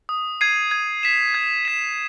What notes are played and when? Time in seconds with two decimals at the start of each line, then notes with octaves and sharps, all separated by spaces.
0.09 D#6
0.41 G#6 C7 D#7
0.71 G#6
1.03 B6 E7
1.34 G#6
1.65 B6 E7